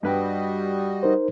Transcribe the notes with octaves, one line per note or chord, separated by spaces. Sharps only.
G2 G3 F#4 B4 D#5 G5
D#4 A#4 C5